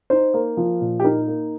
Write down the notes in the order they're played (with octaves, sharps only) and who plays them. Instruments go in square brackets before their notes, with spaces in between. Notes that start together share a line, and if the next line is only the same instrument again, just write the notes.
[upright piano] D#4 C5
A#3
F3
A#2
G4
D#4 A#4
A#3